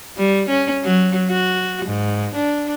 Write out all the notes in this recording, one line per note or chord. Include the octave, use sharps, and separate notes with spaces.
G3
C#4
F#3
F#4
G#2
D4